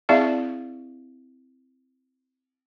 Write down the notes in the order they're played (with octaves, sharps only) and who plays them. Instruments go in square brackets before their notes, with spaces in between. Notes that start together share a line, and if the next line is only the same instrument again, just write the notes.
[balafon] C4 E4 G#4 D5 E5 F5